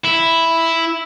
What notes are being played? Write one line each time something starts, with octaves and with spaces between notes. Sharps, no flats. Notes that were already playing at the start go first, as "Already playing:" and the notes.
E4